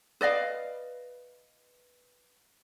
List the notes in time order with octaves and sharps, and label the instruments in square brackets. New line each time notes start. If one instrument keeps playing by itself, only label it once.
[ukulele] B4 D5 D#5 F5